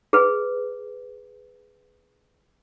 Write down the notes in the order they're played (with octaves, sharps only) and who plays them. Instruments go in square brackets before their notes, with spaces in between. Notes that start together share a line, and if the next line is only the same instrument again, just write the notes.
[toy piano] G#4 B4